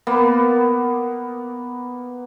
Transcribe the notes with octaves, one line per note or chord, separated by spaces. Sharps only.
A#3 B3